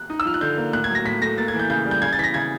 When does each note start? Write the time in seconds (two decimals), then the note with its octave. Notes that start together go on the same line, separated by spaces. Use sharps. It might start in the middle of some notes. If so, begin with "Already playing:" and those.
Already playing: F#6
0.10 D#4
0.20 E6
0.25 F3 F6
0.34 F#6
0.41 D3 G6
0.57 A#3
0.73 A2 F#6
0.84 G#6
0.90 F#3
0.95 A#6
1.05 A2 B6
1.21 A3 A#6
1.38 A#3 A6
1.48 G#6
1.54 E3
1.60 G6
1.70 C#3 G6
1.86 G3
1.91 G6
2.02 C#3 G#6
2.13 A6
2.18 E3 B6
2.24 A#6
2.34 C#3 G#6